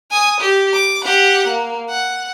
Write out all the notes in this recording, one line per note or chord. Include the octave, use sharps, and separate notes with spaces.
G#5 D#6
G4
D6
G4 F#5
A#3
F#5